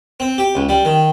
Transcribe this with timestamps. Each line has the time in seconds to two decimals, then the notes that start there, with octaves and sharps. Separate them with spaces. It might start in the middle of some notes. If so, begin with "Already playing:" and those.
0.20 C4
0.38 G4
0.55 C#2
0.69 G3
0.85 D#3